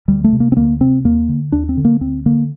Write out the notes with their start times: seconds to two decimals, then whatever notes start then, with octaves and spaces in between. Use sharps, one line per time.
0.08 D2 G3
0.24 A3
0.33 C3
0.40 A#3
0.52 C4
0.57 D2 A#3
0.80 C3 C4
1.04 D#2 A#3
1.29 D3
1.52 D#2 D4
1.69 C4
1.77 D3
1.85 A#3
2.01 D2 C4
2.26 D3 A#3